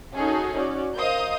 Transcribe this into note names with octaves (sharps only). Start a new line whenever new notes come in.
C#4 D#4 F#4 G#4 A4
C#4 F#4 D5
A#4 C5 D#5 F5 D#6 G6